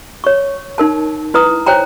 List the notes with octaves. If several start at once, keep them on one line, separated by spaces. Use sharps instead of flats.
C#5 C#6
D#4 A#4 A5
E4 B4 A#5 D#6
C5 C#5 G5 G#5 A#5